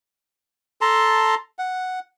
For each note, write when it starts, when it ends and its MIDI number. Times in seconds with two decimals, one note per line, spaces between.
0.81 1.35 69
0.81 1.35 81
0.81 1.35 82
0.81 1.35 84
1.59 1.99 78